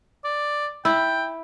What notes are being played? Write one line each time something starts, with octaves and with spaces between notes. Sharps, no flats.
D5
E4 G5